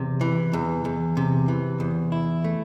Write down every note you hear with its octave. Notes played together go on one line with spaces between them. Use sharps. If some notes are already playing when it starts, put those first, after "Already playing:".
Already playing: E2 C3
E3
E2
E2
C3
E3
E2
E4
A3